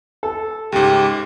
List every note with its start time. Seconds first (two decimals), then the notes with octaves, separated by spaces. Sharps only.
0.23 A4
0.72 C#2 G#2 G4